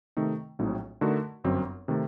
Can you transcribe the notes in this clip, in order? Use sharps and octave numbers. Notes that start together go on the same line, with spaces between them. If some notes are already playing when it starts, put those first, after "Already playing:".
C3 D#3 A3 D#4
A#1 A2 F#3 C4 D#4
D3 A3 D#4 F#4 A#4
G1 F#2 F#3 C4
C3 D#3 A3